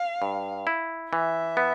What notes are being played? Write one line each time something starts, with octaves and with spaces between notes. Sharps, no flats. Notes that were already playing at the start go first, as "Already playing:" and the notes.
Already playing: F5
G2
E4
E3 E5
B3